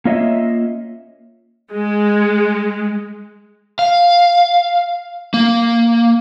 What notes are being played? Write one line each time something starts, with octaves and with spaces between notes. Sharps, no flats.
A#3 C#4 F4 C#5 D#5 E5
G#3
F5
A#3